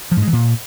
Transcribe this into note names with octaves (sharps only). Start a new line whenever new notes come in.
F3
G#2
G#3
E3
A#2